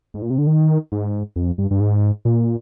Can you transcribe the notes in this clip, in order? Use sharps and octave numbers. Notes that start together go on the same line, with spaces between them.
G#2
A#2
C3
D3
D#3
G#2
F2
G2
G2
G#2
A#2